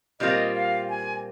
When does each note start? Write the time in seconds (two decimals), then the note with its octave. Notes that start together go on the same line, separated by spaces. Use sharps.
0.20 A#2 G3 C4 F4 A#4 D#5
0.54 F5
0.89 G#5